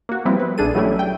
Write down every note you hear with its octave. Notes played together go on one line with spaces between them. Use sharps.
A#3 F#4
F3 G3 B3 C4 E4
B4
A#1 D4 G#4 A4 D#7
E3 F#3 G3 A3 C#4 E4
G5